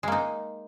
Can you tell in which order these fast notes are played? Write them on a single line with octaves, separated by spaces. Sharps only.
G#3 A#3 D#4